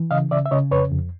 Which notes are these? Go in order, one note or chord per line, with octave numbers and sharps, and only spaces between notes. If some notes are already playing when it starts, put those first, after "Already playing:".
Already playing: E3
C#3 D#5 F5
C#3 D5 E5
E5
C#3 C#5 D#5
F2 B4 C#5
F2